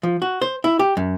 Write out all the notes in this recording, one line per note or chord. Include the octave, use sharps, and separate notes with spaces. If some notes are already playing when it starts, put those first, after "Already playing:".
F3
F#4
C5
E4
G4
F#2